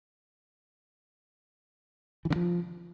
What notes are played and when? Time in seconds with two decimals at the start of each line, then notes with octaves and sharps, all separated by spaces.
2.25 E3
2.30 D3
2.36 F3